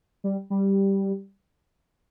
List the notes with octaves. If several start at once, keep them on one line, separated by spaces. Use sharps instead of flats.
G3
G3